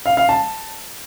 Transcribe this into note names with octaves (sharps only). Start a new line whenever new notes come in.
F5
F5
A5